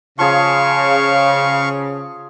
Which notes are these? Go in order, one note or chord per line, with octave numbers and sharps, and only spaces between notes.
C#3 F3 G#4 F5 C#6